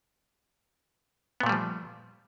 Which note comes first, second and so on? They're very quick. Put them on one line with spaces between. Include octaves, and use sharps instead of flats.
B3 A#2 A3 G3 F3